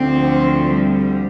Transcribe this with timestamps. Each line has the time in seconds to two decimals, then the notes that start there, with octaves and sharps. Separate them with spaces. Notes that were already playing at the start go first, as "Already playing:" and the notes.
Already playing: D2 D3 F3 C4
0.64 G3